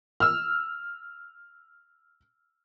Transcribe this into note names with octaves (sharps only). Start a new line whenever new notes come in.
E6 F6